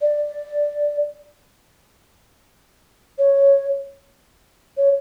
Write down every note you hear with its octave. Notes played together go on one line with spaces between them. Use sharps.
D5
C#5
C#5